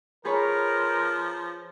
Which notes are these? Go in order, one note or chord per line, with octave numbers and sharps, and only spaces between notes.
F3 G#4 A#4 B4 C#5